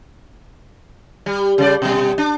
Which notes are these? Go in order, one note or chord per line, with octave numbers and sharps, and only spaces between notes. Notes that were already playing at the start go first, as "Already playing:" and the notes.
G3
C#3 G3 D5
B2 G3
D4